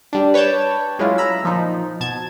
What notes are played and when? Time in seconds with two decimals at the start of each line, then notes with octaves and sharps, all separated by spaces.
0.13 G3 D4
0.34 B4 C#5 D5 G5 A5
0.99 F#3 G#3 C#4 E4 F4
1.18 A#5 B5 E6
1.43 A#2 F3 D#4
2.00 B2 A5 G#6